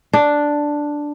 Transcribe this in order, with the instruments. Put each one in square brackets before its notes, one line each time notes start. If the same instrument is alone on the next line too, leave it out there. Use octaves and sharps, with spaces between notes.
[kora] D4